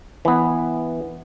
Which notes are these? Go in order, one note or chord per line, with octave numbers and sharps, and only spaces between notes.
E3 B3